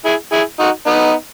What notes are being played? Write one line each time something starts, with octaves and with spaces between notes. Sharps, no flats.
E4 G#4
E4 G#4
D#4 F#4
B3 D#4